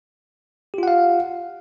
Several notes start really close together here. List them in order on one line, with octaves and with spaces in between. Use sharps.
G4 F4 F#5 F5